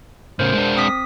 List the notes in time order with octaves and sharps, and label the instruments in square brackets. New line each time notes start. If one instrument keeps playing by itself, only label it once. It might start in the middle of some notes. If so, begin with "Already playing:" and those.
[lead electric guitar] A2 C#3 [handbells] A#4 C5
[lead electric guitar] G#3 D4
[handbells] C4 D#6 B6